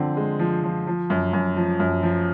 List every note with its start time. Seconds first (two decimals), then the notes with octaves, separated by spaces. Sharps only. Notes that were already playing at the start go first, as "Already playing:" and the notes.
Already playing: D3 F3 C4
0.17 G#3
0.39 F3
0.63 F3
0.87 F3
1.10 F#2
1.33 F#2
1.56 F3
1.80 F#2
2.03 F3